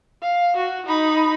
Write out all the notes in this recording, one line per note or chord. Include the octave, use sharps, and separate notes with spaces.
F5
F#4
D#4 B5